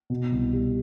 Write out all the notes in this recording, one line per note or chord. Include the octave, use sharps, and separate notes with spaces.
B2
C2
G3